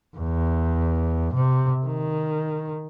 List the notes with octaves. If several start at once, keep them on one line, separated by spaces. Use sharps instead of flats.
E2
C3
D#3